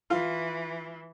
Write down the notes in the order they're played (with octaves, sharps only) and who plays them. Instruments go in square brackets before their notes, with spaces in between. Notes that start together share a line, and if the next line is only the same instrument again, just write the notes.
[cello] E3 [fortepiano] F4